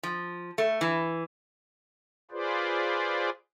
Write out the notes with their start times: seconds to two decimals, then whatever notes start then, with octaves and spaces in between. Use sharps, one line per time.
0.03 F3
0.58 A3
0.81 E3
2.31 F4 G#4 B4 C5 D5